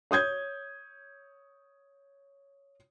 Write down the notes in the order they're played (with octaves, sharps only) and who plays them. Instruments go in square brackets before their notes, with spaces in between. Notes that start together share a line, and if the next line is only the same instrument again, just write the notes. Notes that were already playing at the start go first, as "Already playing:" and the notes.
[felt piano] C#5 D#6 G6 G#6